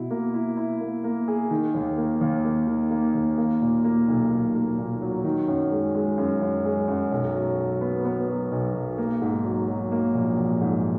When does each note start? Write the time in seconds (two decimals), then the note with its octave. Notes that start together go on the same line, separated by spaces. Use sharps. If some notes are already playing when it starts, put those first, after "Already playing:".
Already playing: B2 E4
0.11 A#3
0.34 E4
0.57 E4
0.81 A#3
1.04 A#3
1.28 G#4
1.51 D#3
1.74 D#2
1.98 A#3
2.21 D#2
2.45 A#3
2.67 D#3
2.91 A#3
3.14 D#2
3.38 A#3
3.61 A#2
3.84 A#3
4.08 B1
4.31 B1
4.55 A#3
4.78 A#2
5.02 F#3
5.24 D#3
5.48 F#2
5.71 G#3
5.94 G#3
6.18 F#2
6.42 F#2
6.65 G#3
6.88 F#2
7.12 B1
7.35 F#3
7.58 F#3
7.81 B3
8.05 B3
8.29 F#3
8.52 B1
8.75 B1
8.98 A#3
9.22 G#2
9.45 F#3
9.68 F#3
9.92 A#3
10.15 A#1
10.38 A#1
10.61 G#2